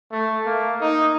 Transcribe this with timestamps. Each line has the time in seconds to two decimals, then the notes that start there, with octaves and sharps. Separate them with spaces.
0.12 A3
0.46 A#3
0.80 D#4